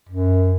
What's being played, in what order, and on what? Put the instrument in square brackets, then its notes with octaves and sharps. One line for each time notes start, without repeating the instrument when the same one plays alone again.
[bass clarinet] F#2